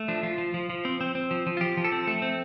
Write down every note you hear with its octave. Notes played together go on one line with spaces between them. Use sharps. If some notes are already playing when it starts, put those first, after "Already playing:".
Already playing: A3
F3 D4
F3 F4
F3
F3
F3
C4
C4
C4
F3
F3
F4
F3 G4
F3
A4
C4
A3 A4
C4